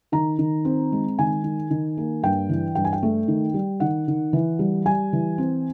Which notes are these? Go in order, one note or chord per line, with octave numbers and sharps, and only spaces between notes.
D#3 A#5
D#3
C4
G#3
D#3 G#5
D#3
D#3
A#3
G2 G5
E3
G2 G5
G#5
G5
A3
D#3
G3
D#3 F#5
D#3
E3
G3
G3 G#5
E3
C4